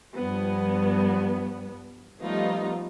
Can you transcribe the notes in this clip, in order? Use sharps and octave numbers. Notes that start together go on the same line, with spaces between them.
G2 F3 B3
F3 G3 A3 B3 D#4 F4